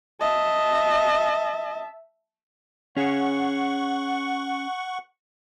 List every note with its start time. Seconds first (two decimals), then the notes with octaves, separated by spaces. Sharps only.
0.21 D#5 E5 A5
2.97 C#4 G#4 F#5 C#6